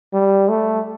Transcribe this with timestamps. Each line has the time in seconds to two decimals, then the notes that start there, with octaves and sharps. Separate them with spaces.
0.14 G3
0.49 A3